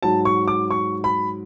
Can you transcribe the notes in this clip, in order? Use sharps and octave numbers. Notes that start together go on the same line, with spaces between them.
G#2 F#3 A5
C#6
D6
C#6
B5